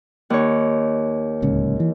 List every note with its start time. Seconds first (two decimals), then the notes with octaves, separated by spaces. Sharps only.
0.30 D#2 C#5
1.42 D1 C#2 C#4
1.80 E3